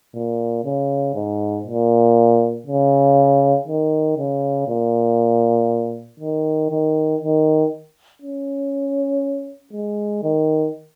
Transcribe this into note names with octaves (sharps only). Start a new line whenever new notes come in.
A#2
C#3
G#2
A#2
C#3
D#3
C#3
A#2
D#3
D#3
D#3
C#4
G#3
D#3